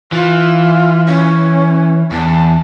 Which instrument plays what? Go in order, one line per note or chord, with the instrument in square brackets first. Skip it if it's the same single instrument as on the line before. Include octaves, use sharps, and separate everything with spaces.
[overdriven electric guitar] E3 [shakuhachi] F4
[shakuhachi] C#4
[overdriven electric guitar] E2 [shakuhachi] A5